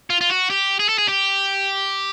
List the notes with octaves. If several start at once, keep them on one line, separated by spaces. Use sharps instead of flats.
F4
F4
F#4
G4
G#4
A4
G#4
G4